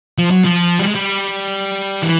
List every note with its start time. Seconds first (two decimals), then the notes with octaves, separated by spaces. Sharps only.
0.18 F3
0.31 F#3
0.45 F3
0.79 G3
0.87 G#3
0.95 G3
2.02 E3